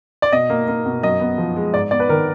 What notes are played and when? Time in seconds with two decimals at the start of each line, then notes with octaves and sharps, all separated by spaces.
0.22 D5
0.32 B2 D#5
0.50 A#3
0.68 A#3
0.86 B2
1.03 F#2 D#5
1.20 B3
1.38 F3
1.56 G#3
1.74 G#2 D5
1.91 B3 D5
2.00 B4
2.09 D#3 A#4